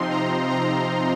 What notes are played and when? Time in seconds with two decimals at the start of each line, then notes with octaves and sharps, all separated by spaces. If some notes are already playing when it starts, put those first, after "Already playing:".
Already playing: C3 F3 C4 D#4 C6
0.11 A#5
0.49 A#5